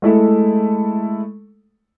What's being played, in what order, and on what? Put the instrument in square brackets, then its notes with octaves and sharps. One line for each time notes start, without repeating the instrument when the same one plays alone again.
[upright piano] G#3 A3 E4 A4